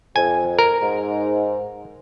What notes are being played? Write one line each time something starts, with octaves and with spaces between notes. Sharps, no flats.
F2 G#5
A#4
G#2